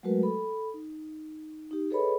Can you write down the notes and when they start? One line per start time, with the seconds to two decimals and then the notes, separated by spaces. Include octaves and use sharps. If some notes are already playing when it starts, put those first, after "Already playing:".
0.03 F#3 G#3 A3 F#4 A#4 B4
0.23 A4 B5
0.74 D#4
1.71 D#4 G4
1.91 G#4 A4 B4 C#5 D#5 B5